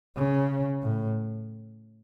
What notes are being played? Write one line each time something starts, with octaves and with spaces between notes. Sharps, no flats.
C#3
A2